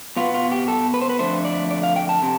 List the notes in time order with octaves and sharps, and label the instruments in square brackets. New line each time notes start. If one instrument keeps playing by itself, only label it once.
[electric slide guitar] B2 B3 F4
F4
G4
A4
B4
C5
B4
F2 D3 A3 C5
D5
D5
F5
G5
A5
C3